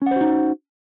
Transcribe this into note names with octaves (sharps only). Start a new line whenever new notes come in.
C#4 D#4 F#4 C5 F#5